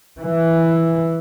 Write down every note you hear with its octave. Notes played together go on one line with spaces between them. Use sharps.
E3